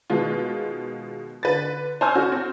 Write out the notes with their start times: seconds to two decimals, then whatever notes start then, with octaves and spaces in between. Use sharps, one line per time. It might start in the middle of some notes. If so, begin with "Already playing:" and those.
0.10 B2 D#3 G#3 F4
1.43 D3 B4 A6
2.01 C5 C#5 G#5 E6 F6 G6
2.15 C#4 D4 F#4 A4
2.32 C4